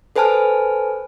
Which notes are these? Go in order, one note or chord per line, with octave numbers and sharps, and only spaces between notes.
A4 B4 C5 G#5 A5 F6